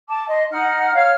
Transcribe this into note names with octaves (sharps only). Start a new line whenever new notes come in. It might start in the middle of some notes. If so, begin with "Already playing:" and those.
A5 D6
D#5 C6
D#4 F#5 F6
C#5 F5 F6